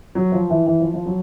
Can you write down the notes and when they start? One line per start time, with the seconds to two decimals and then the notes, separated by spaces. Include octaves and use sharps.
0.15 F#3
0.32 F3
0.50 E3
0.67 E3
0.80 F3
0.94 F3
1.06 F#3